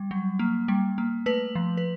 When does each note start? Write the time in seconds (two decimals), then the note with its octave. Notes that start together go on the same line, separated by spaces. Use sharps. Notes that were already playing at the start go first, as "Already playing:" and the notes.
Already playing: G3
0.11 F#3
0.39 A#3
0.68 G3
0.98 A#3
1.26 A3 B4
1.55 F3
1.77 B4